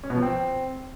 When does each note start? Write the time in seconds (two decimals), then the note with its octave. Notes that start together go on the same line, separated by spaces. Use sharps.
0.04 C#4
0.10 B2
0.16 F3
0.23 C4